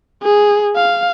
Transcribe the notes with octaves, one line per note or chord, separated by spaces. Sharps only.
G#4
F5